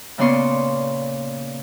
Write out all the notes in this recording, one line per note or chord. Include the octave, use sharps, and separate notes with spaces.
A#2 C#3 B3 D5 C6 C#6